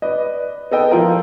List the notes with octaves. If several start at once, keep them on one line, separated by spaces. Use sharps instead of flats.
B4 D5 D#5
B3 A4 D#5 G5
F3 E4 F4 A#4